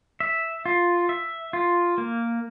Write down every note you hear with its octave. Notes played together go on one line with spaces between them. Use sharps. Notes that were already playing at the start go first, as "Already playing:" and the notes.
E5
F4
E5
F4
A#3